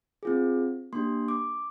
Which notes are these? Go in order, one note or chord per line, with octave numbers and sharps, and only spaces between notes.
C4 F4 G#4
A#3 D4 G4 C6
D6